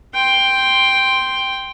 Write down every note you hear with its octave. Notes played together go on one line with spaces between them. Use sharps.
G5 C6